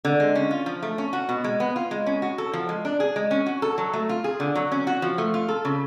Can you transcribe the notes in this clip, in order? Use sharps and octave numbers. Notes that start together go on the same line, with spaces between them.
D3
G#3
C#4
F4
F3
A3
C#4
F#4
B2
G#3
B3
F4
G#3
C#4
F#4
A4
F3
G#3
D4
G#4
G#3
C#4
F#4
A4
F#3
A3
F4
G#4
D3
F#3
C#4
F#4
F3
A3
F4
A4
C#3